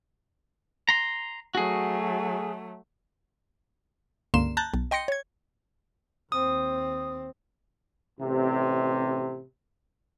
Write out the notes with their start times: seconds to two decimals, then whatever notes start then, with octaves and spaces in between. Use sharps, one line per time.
0.89 A#5 C6
1.55 F#3 A3 F#4 G#4
4.34 C#2 G2 D3 A#3 C6 E7
4.57 A5 A#5 F#6 G6 A6
4.74 B1
4.91 D#5 G5 C6 A#6 C#7
5.08 C#5 G#6
6.32 D#2 C4 D#6
8.18 A1 C3